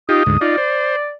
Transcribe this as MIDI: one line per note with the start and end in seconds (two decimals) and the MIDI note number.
0.09 0.23 63
0.09 0.23 65
0.09 0.23 67
0.09 0.36 87
0.26 0.37 38
0.26 0.37 44
0.41 0.56 63
0.41 0.56 65
0.41 1.12 74
0.57 0.96 72